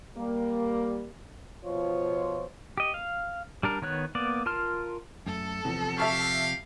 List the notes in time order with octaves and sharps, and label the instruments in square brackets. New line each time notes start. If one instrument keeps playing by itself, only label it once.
[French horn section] G3 A#3
B2 F3 F4 C5 C#5
[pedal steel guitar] G4 D#5
F5
G3 D4 A#4
D#3 B3 C#5 F#6
A#3 B3 D5
F4 A#4 A5 C6 F6
[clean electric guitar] F#2 A3 [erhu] A4
[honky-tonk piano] E2 [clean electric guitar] C3 F3
[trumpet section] G4 F5 [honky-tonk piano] E5 A5 C#6